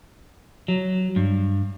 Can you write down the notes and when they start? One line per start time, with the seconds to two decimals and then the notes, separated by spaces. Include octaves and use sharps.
0.68 F#3
1.16 G2